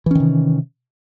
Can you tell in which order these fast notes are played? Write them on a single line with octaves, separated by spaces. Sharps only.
E3 C#4 D#3 C3